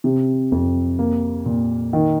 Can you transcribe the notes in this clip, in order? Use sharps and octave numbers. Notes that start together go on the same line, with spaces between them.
C3
F2
A#3
A#2
D#3